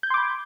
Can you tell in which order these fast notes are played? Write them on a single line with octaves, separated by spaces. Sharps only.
G6 G#6 C6 D6 B5